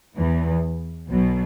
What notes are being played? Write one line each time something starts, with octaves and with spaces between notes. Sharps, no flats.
E2 E3
B1 B2 F#3